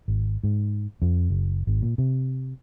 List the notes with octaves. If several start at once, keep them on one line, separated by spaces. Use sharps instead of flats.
G#1
G#2
F2
F#1
G#1
A#2
C3